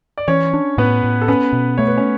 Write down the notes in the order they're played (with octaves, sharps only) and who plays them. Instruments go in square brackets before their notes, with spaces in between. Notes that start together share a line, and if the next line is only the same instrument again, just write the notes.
[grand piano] D5
[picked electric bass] E3 [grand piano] C#4 C#5
[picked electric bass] D4
[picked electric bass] A2 [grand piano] B3 B4
[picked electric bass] A2
[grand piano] A4
[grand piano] B3 B4 [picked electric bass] C#4
[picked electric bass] B2
[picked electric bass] A3 [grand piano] C#5
[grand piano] B4
C#4 C#5